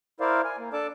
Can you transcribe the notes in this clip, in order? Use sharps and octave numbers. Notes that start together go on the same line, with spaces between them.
E4 A#4 C5 D5 F5
G#5
A#3
D4 A4 D5 A5 D6